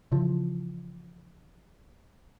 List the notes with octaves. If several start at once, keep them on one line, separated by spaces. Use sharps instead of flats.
C#3 E3 F3